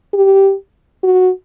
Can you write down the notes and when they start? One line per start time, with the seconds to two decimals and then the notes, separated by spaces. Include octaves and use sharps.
0.13 G4
1.03 F#4